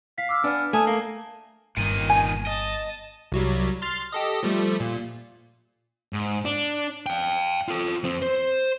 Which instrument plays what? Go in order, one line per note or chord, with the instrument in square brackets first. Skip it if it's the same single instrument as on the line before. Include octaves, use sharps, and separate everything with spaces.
[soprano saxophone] F5 [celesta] B6
[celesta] D6 E6 F6
[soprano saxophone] B3 [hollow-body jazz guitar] D4 [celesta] G#5 F6
[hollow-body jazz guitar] A3 [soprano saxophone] G#5 [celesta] A5 D#6
[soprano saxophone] A#3
[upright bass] G1 [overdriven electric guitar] A#2 D#3 [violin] D#7
[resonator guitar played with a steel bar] G#5
[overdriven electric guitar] D#5 [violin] A5
[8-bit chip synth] C2 F#3 G3
C6 F6 A6
G4 A4 D#5
F3 G3 A3
A#2
[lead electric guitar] G#2
D4
F5 G5
F4 A4
F2 C4
C5 C6